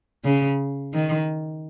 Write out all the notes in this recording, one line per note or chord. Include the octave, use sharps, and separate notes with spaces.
C#3
D#3